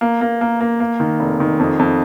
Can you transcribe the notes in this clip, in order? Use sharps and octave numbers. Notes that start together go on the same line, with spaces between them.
A#3
A#3
A#3
A#3
A#3
D#3
F1
D#3
F2
F2